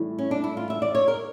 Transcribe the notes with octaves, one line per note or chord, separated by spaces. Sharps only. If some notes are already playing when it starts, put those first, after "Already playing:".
Already playing: A2 E3 G3
C#4
D4
E4
F4
E5
D5
C#5
A#4